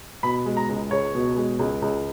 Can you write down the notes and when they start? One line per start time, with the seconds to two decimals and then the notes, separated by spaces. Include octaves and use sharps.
0.23 B2 B5
0.46 G#3
0.57 A#5
0.69 C#2
0.91 C#2 C#5
1.15 B2
1.37 G#3
1.59 C#2
1.82 C#2